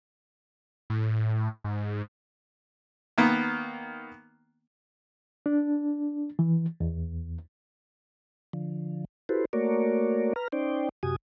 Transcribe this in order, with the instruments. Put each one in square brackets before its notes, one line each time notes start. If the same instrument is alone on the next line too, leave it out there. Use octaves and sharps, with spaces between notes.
[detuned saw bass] A2
G#2
[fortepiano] D#3 A#3 B3
[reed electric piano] D4
E3
E2
[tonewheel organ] D3 F3
E4 F#4 G4 A4 B4 C5
A3 A#3 F#4 A#4 C#5 D5
B4 A#5 F6
C#4 D#4 C5 D5 G5
F#2 C3 F#4 G4 G#5 D#6